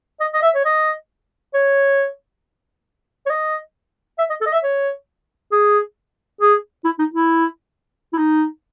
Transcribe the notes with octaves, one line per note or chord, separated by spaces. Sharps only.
D#5
D#5
E5
C#5
D#5
C#5
C#5
D#5
E5
D#5
A4
D#5
E5
C#5
G#4
G#4
E4
D#4
E4
E4
D#4